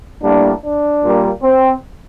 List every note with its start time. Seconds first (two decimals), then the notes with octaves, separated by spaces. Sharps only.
0.23 A2 G3 A#3 D4
0.63 D4
1.03 A#2 G3 A#3
1.43 C4